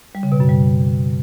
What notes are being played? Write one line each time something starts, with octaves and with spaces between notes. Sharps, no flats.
G3
C#3
B2
F#2
G3